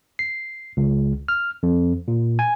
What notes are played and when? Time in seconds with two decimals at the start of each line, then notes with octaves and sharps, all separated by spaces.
0.19 C7
0.77 C#2
1.28 F6
1.63 F2
2.08 A#2
2.39 G#5